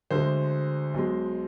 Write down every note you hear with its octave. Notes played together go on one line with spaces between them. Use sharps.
D2 D3 G#3 C5
B1 B2 G#3